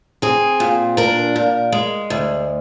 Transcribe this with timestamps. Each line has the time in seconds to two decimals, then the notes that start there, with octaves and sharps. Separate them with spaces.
0.22 C4 G#4
0.60 A#2
0.97 D4 A#4
1.36 A#2
1.72 G#3
2.10 D2